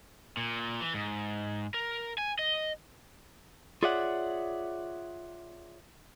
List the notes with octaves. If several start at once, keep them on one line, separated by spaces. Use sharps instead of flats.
A#2
E3
G#2
A#4
G#5
D#5
F4 G#4 C#5 D5 E5 F#5